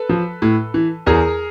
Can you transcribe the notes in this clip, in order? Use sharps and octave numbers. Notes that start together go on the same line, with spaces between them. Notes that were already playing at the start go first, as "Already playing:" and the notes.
Already playing: A4 B4
F3
A2
E3
E2 G#4 A#4